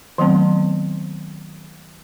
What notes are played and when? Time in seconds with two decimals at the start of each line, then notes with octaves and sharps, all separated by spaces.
0.18 D#3 F#3 A3 B3 C4